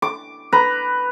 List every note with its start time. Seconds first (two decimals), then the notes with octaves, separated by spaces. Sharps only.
0.02 D6
0.52 B4 A#5